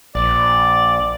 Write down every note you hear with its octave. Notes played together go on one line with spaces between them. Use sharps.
A#1 D5